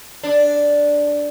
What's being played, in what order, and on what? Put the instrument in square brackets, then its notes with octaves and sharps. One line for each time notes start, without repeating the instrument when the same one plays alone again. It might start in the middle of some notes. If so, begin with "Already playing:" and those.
[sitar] D4